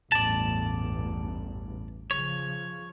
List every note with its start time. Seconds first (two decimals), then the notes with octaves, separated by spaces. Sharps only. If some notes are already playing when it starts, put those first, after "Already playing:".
0.12 A1 E2 G2 D5 A5
2.11 C#3 F3 C#5